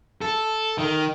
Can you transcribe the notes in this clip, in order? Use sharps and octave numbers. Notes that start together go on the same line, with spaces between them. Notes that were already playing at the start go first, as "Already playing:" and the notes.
A4
D#3